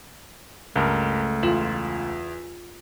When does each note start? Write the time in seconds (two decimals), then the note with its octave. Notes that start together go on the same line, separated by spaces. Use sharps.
0.76 C#2 G2 A3 A#4 F6
1.43 E2 F4 E7 F#7